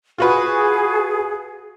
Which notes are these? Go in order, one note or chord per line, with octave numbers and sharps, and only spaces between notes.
F4 F#4 G#4 B4